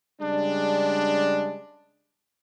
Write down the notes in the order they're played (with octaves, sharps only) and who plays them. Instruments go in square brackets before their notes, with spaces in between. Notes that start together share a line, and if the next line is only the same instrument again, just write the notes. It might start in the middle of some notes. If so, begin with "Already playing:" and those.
[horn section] C#3 G3 G#3 D4